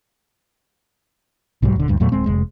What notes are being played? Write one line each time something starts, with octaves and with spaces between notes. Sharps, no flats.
B1 G#2 F#3 G3
D#1 D3
D2 G2
E2 A#2 F#3 A3
D1 G#3 C4
F1 G#3